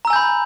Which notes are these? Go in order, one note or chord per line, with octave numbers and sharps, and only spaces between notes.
G#5 A#5 B5 E6 G6